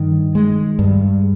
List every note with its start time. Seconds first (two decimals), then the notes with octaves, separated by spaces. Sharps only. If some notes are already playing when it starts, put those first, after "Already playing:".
Already playing: G2 D#3
0.35 G#3
0.79 G2